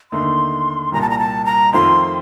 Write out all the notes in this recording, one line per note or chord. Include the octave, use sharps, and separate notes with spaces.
D#2 D3 A3 D#4 C6
C2 A#2 G3 A#5
A5
A#5
A5
A#5
F2 D#3 A3 C4 F4 C6